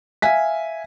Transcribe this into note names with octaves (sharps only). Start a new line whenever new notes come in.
E5 F5 G#5 B6